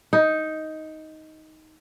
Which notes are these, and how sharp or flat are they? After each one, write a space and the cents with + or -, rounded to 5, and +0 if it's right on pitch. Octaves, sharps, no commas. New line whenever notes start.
D#4 +10